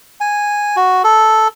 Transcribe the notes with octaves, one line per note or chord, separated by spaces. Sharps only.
G#5
F#4
A4